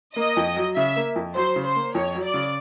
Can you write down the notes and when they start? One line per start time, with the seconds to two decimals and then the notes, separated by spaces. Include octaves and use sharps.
0.16 A#3 D#5
0.37 F2
0.56 F#3
0.76 C#3 E5
0.96 A#3
1.16 F2
1.35 F#3 C5
1.56 C#3
1.66 C5
1.76 A#3
1.95 F2 C#5
2.15 F#3
2.24 D5
2.34 C#3